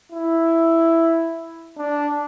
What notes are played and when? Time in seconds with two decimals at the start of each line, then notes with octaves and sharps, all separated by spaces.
0.12 E4
1.77 D4